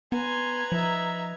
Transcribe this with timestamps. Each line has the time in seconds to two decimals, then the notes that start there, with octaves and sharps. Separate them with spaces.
0.12 B3 B4 G#5 A#5 C6 G#6
0.72 F3 D#4 E5